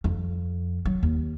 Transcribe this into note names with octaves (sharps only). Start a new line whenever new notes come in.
F2
F#3
D#2